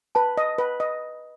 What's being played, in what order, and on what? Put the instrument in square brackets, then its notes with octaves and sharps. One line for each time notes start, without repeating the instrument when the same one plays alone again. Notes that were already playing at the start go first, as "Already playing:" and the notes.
[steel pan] B4 [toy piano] A5
[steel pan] D#5
B4
D#5